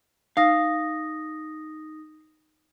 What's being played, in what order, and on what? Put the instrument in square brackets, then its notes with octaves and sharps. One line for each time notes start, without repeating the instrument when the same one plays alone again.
[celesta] D#4 D#6 A#6 [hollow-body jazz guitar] F5